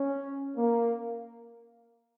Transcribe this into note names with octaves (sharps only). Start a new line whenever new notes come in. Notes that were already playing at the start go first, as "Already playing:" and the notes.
Already playing: C#4
A#3